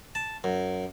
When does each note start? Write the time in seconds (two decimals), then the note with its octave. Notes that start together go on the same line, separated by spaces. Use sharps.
0.15 A5
0.44 F#2